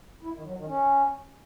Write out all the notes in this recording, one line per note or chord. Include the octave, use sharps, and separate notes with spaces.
E4
D#3
F#3
D#3
C#4